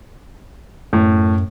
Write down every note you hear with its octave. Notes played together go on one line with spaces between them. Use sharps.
F#2 A2